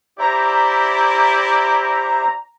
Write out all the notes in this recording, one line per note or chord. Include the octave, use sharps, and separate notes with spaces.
E4 G4 C5 D5 E5 A#5